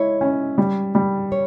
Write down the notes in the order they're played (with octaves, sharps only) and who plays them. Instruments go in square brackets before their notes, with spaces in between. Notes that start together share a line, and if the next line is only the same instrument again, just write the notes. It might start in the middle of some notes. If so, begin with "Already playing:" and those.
Already playing: [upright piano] G#3 E4 [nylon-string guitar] C#5
[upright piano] C#4
G3
G3
[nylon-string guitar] C#5